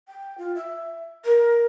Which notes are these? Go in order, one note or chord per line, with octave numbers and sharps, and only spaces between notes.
G5
F4
E5
A#4